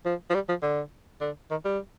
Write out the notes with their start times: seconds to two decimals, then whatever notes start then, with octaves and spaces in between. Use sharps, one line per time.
0.06 F3
0.30 F3
0.34 G3
0.49 F3
0.63 D3
1.21 D3
1.51 D#3
1.65 G3